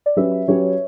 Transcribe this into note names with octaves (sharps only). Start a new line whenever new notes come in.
D5
F#3 C#4 G4 B4 E5
E5
F#3 C#4 G4 B4 C#5